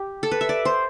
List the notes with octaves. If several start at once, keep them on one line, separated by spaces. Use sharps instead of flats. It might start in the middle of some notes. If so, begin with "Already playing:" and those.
Already playing: G4
A4
B4
E5
D5
C5